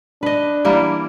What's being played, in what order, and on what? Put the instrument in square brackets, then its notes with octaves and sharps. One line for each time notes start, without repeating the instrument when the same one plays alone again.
[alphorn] D4 [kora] B4 D#5
[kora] E3 G3 A#3